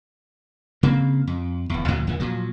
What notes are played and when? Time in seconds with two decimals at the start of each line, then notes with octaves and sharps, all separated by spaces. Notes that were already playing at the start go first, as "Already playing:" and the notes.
0.83 C#3 A#3 C4
1.27 F2
1.70 D1 E2
1.88 D2 A#2 E3 F#3
2.07 D#2 D3 F3
2.20 A#2 F3 F#3